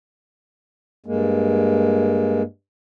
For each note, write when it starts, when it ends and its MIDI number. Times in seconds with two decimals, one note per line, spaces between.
1.06 2.43 43
1.06 2.43 56
1.06 2.43 58